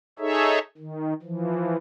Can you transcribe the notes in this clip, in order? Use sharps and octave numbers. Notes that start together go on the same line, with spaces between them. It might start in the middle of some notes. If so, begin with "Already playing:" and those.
D#4 G#4 A4 C#5 E5
D#3
E3 F3